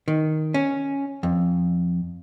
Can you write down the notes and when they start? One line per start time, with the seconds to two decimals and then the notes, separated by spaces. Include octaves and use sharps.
0.08 D#3
0.54 C#4
1.23 F2